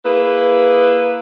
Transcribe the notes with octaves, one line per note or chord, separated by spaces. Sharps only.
A#3 E4 G#4 B4